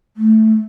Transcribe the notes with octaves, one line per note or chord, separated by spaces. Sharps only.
A3